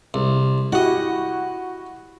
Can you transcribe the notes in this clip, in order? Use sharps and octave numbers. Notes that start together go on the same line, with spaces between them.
C2
E4 F#4 G4 D#5 F#5